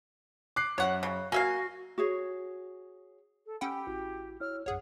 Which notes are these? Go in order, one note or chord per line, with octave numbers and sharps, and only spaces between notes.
D6 F#6 C7
F#2 C#5 F#5
C#3
A#3 F#4 E5 F5 G#5
F#4 G#4 C#5
A4
C#4 G4 F#5 G5 B5 E6 G6
A1 E4 F#4
E4 C#5 E6 F6
A#1 F#2 G#4 C#5 F#5